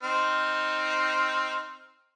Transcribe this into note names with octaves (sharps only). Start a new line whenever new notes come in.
C4 D#4 F6